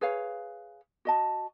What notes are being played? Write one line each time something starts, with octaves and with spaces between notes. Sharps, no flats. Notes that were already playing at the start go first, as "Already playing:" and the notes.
G#4 B4 C#5 F5
F#4 D#5 A5